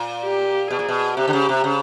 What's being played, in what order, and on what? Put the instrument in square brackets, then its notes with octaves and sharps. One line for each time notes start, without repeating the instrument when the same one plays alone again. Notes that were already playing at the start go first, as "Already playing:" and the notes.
Already playing: [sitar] A#2
[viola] G4
[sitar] B2 [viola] G#4
[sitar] A#2
B2
[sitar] C3 [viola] G4
[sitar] D3
C#3
C3
C#3